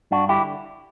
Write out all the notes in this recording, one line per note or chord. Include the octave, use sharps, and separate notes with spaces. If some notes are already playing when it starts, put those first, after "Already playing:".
G2 D4 F#4
D3 E4 G4